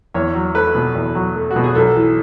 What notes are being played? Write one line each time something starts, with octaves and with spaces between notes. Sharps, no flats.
E2 C#5
F#3
A3 B4
B2
E2
F#3
A3
F#4
B2
G#4
B1 A4
E3